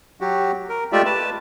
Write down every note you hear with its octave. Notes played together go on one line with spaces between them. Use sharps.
F#3 F#4 G4
A#4
G#3 A3 F4 G4 D5 E5
B4 A5